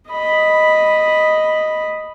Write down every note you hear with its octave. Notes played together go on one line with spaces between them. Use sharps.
D#5 B5